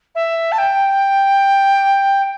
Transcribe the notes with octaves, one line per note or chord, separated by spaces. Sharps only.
E5
A5
G5